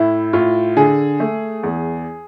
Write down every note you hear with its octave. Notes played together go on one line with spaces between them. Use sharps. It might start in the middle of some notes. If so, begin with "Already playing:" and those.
Already playing: A2 E4
A2 F4
D3 G#4
A3
E2